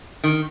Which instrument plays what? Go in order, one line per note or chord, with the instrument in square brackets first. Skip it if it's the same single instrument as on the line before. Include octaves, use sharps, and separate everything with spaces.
[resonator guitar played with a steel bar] D#3